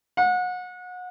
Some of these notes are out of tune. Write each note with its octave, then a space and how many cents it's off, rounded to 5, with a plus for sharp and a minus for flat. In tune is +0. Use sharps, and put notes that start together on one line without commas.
F#5 -30